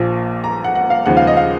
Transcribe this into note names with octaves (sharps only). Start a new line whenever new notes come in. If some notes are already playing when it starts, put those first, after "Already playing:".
Already playing: A#1 A#2 F3
A#5
F#5
F#5
F5
D#2 C#3 F3 G#3 F#5
F5
D#5
F5